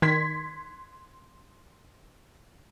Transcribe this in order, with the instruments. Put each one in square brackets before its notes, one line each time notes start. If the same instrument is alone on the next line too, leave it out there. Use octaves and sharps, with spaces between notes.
[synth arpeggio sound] D#3 [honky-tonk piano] C6 G#6 B6